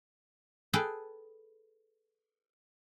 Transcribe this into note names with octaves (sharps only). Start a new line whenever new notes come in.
G#4 A4 B4 G5 A5